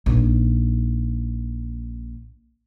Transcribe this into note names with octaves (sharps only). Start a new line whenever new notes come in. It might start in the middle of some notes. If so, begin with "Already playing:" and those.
A#1 D#4